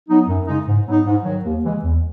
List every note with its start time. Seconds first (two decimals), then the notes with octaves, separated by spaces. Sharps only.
0.09 F#3 B3 D#4
0.27 F#2
0.47 C#3 G#3 D#4
0.67 G#2
0.86 F#3 B3 D#4
1.05 G#2
1.24 D#3 F#3
1.44 D#2
1.63 C#3 E3 G#3
1.83 E2